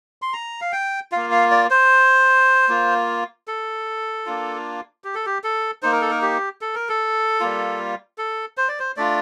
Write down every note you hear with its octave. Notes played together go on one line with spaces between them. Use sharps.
C6
A#5
F5
G5
A#3 F4 F5
F5
D5
C5
A#3 F4
A4
A#3 D4 F4
G4
A4
G4
A4
A#3 D#4 C5
A#4
A4
A#4
G4
A4
A#4
A4
G3 A#3 F4
A4
C5
D5
C5
A3 D4 F4 D5